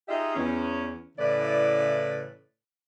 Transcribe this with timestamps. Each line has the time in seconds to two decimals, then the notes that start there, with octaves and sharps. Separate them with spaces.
0.09 D#4 F4 G4 G#4 D#5 E5
0.35 E2 C#4
1.18 A2 C#3 E3 B4 D5